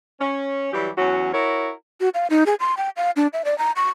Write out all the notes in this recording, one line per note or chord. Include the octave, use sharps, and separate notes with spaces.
C#4
E3 F#3 G3 G4
E2 F#3 C#4 F#4
E4 F#4 A#4 C#5
F#4
F5
D#4
G#4
C6
G5
F5
D4
E5
D5
A#5
C#6